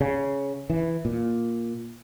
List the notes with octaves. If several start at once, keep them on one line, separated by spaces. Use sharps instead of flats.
C#3
E3
A#2